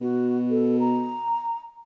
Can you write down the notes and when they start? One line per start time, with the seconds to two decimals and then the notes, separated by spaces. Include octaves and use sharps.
0.01 B2 F#4
0.50 A4
0.80 A#5